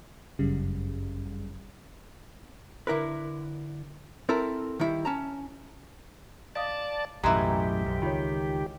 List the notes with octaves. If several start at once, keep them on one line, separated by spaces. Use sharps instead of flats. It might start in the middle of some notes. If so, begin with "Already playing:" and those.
G1 F#2 C#3 G3
D3 E4 A#4 B4
C4 E4 A4 A#4
D#3 G3 E4
C#4 A5 A#5
D5 D#5 F5 A5 D#6
B1 F#2 A2 E3 G#3 G4 A#5
B1 F#2
C#2 D#3 F4 C#5